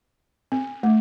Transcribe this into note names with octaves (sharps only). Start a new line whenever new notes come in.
C4
A3